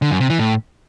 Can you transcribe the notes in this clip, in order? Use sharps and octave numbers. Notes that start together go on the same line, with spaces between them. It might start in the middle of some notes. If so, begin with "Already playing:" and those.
D3
F#2
C3
E3
A2